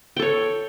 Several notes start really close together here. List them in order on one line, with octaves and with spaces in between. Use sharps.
G5 A4 C#5